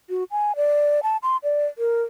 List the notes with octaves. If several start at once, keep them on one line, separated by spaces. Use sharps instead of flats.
F#4
G#5
D5
A5
C6
D5
A#4